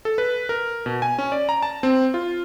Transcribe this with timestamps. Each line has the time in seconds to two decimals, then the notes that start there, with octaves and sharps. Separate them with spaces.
0.05 A4
0.18 B4
0.49 A#4
0.86 B2
1.02 G#5
1.19 C#4
1.32 D5
1.49 A#5
1.63 A5
1.83 C4
2.14 F4